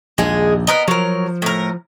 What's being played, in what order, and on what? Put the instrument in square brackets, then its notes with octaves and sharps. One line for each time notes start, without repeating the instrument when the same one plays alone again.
[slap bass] A#1 D#2 [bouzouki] G#3 G#4
[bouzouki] B3 A#4 D#5
[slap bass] F3 [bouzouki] F#3 A#4
[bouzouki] A2 A#4